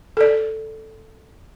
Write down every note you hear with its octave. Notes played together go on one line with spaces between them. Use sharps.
A4 D5